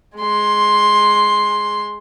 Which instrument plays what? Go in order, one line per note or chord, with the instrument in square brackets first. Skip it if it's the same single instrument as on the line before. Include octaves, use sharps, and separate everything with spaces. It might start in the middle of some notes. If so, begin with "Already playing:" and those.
[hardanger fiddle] G#3 C6